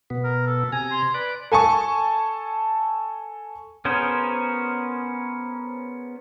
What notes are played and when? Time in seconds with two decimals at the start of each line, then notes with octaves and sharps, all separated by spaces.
0.10 B2 B3
0.24 A#4
0.46 A4
0.72 C3 G#5 A#5
0.91 C6
1.14 B4 D5
1.52 A4 G#5 A5 C#6
3.85 B3 C#4 G#4 A#4 C5